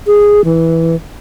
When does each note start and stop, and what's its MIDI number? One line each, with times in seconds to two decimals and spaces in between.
0.07 0.41 68
0.45 0.96 52